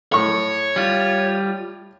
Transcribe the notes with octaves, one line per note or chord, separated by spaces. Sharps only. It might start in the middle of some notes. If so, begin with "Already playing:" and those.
A2 C#5 C#6
G3 F4